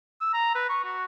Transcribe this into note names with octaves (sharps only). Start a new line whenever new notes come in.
E6
A#5
B4
C#6
F#4